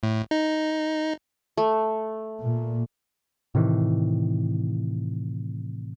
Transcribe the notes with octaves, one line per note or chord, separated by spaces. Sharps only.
A2
D#4
A3
A#2
A2 C3 D#3 E3